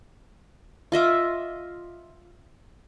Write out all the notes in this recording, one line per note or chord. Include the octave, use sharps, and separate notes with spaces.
F4 D#5 E5 D6